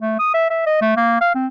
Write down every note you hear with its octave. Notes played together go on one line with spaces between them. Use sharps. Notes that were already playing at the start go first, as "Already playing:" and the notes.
A3
D#6
E5
E5
D#5
A3
A#3
F5
C4